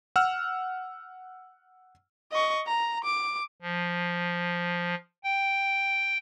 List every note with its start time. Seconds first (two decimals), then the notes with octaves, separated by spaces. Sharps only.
0.16 F#5 E6 F6
2.32 D#5 C#6
2.67 A#5
3.04 D6
3.62 F3
5.24 G5